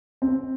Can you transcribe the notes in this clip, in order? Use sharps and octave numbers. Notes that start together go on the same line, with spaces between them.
C4